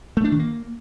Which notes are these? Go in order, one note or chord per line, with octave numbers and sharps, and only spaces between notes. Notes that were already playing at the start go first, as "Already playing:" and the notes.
A3
D4
D#3
A#3